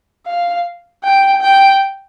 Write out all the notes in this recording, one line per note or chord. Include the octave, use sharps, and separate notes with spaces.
F5
G5
G5